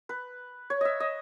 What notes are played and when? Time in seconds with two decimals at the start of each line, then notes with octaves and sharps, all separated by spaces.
0.09 B4
0.70 C#5
0.81 D#5 E5
1.00 D#5